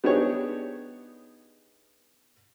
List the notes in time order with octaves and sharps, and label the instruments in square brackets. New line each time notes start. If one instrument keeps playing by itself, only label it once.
[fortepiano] B3 D4 D#4 G4 G#4 C#5